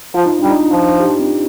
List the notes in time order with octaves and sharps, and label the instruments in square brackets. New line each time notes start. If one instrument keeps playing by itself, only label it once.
[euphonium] F3 [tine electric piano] F4
[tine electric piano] D#4
[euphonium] G3 [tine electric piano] D4
[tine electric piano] D#4
[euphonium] F3
[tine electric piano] G4
C4